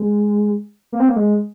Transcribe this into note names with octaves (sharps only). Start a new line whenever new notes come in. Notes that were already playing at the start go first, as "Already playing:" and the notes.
Already playing: G#3
A#3
C4
A#3
G#3